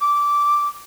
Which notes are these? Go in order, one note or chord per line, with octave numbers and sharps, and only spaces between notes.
D6